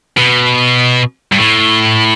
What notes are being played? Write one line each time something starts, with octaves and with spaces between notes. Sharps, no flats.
B2
G2
A2